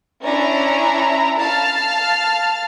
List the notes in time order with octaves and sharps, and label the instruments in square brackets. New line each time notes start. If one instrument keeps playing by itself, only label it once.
[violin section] C#4 D4 E4 A#5
F5 A5 F6